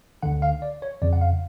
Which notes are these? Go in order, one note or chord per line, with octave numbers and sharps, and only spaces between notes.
D2 D3 F#5
F5
D5
C#5
F2 C#3 D5
F#5
F5